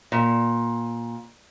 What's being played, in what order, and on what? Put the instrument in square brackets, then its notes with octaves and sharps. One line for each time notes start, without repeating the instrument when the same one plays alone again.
[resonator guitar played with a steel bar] A#2